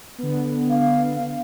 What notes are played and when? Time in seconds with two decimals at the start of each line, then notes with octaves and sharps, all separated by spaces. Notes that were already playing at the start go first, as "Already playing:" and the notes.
0.18 D3 B3
0.70 F5